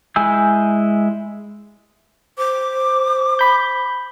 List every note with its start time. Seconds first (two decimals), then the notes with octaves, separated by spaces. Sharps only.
0.16 G#3 E4 G#5 E6 G6
2.38 C5 D6
3.39 B5 G6